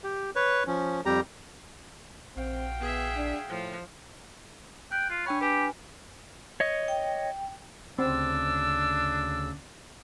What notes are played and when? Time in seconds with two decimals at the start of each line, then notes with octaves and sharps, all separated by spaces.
0.04 G4
0.36 B4 C#5
0.67 F3 C#4
1.05 F2 G3 G4 A#5
2.37 A#1 C4 F#4 F5 G5
2.81 B3 G#4 E5
3.17 D4
3.49 A2 F3
4.92 G5 F#6
5.10 F4
5.26 D4 C#5 G5 B5
5.41 G4 B4 G#5
6.60 C#5 D#5
6.88 G5
7.99 D2 C#3 C4 D4 E6